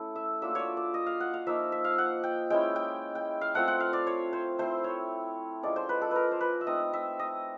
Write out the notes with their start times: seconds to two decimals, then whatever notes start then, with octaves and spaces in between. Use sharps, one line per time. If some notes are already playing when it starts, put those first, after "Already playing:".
Already playing: A3 C#4 E4
0.15 E5
0.42 F#3 A#3 D4 F4 E5
0.55 C#5 D5
0.77 D5
0.94 D#5
1.06 F5
1.20 F#5
1.34 F5
1.47 F3 A#3 D#4 E5
1.72 E5
1.84 F5
1.98 F#5
2.24 G5
2.50 G#3 C#4 E4 G5
2.76 G5
3.15 G5
3.41 F5
3.54 A3 C4 F4 F#5
3.68 F#5
3.80 F5
3.93 D5
4.07 C#5
4.33 C5
4.59 A3 C4 E4 C5
4.84 C#5
5.63 F3 G#3 C#4 D5
5.76 C5
5.89 B4
6.01 A4
6.11 A#4 B4
6.31 C5
6.41 B4
6.61 E5
6.67 A3 C4 D#4 D#5
6.93 E5
7.19 D#5